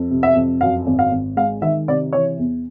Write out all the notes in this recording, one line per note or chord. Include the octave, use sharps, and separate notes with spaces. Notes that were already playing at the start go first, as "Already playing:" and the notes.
Already playing: F2
C3
E5
F2
F#2 F5
G#1
F5
G#1
G#3 F5
D#3 E5
C3 D5
E3 C#5
E2